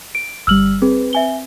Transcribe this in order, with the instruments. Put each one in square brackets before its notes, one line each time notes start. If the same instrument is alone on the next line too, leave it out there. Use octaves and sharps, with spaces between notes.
[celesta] D7
[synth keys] G1 G3 [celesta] E6 F6 F#7
[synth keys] C4 B4 [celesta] G#4
[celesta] E5 G#5 G7